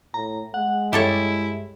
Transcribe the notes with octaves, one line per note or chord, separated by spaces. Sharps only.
A2 A#5
G#3 F#5
G2 E4 G4 A4 C#5